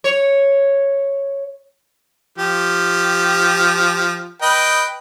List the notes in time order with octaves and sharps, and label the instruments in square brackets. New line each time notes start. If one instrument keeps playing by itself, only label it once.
[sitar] C#5
[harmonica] F3 G4
B4 D#5 G5